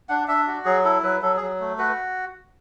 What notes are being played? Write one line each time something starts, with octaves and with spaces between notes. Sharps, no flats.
D4 F#5
D4 E5
F#4
F#3 G#4
E4 A4
F#3 B4
F#3 A4
F#3 G#4
A3
F#4 B4